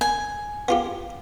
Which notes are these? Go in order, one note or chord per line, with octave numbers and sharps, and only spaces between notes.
G#5
B3 F4 G4